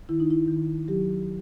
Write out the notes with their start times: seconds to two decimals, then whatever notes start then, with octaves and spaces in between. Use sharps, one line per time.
0.09 D#3 E4
0.20 D#4
0.30 E4
0.48 D#3
0.88 F#3 G4